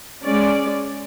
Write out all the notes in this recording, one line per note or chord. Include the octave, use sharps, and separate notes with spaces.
G#3 C#4 D5